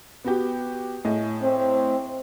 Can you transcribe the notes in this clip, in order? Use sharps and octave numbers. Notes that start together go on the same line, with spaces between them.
B3 F#4 G4
A2 G#4 D#5
C4